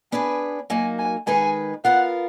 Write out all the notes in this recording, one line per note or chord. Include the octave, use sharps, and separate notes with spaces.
B3 D4 G#4 B4 G#5
F#3 A#3 D#4 F#4 G#5
G#5
D#3 G#3 D#4 G#4 B4 G#5
B3 F4 A#4 F#5